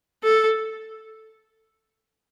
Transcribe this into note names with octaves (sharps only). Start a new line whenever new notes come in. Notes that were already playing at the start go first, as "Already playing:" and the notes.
A4